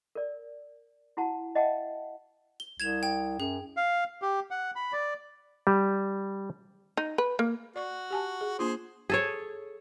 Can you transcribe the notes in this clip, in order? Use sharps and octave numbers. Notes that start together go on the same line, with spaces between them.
A#4 D5
E4 F#4 F#5 A5
D#5 E5 F#5 G5 A5
G7
C2 G#6 E7 F7
G5
F#2 G#4
F5
G4
F#5
B5
D5
G3
D#4
B4
A#3
F#4 D5 C#6
G4 G#5 A5
G#4
A#3 D4 F4 G#4 C5
G#4 A4 C#5